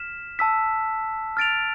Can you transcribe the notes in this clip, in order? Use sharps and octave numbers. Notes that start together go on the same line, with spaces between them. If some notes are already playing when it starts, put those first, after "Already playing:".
Already playing: F6 B6 E7
A5 E6 B6
F6 A6 D7 F7